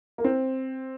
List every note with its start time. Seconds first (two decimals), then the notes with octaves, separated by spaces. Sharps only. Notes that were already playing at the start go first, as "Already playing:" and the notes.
0.18 A#3
0.24 C4